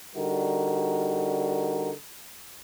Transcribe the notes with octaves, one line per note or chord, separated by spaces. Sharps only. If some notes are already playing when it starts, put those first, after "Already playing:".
D3 G3 D#4 F#4 A#4